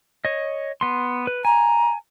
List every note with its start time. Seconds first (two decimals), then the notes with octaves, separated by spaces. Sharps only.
0.25 C#5 D#5
0.81 B3 C6
1.27 B4
1.45 G#5 A#5